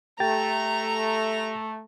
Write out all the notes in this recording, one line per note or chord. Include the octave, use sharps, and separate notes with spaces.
A3 G4 G5 A#5 A6